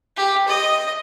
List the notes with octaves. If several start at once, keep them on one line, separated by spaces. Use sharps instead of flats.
G4
D#5